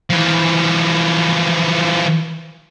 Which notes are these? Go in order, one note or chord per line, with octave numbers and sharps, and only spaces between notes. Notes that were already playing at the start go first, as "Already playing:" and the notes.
E3 F3